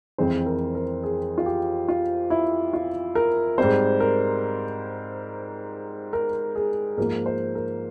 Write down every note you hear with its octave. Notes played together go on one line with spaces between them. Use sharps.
F2 E3 G#3 C4 C5
A#4
A#4
G#4
F4
G4
F4
E4
F4
A#4
G#2 G3 C4 C5
A#4
A#4
G#4
G#2 F3 A#3 A#4
C5
A#4